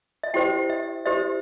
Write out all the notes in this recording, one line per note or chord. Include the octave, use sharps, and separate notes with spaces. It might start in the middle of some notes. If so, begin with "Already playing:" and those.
E5
E4 G4 C5 G5
E5
E4 G4 C5 E5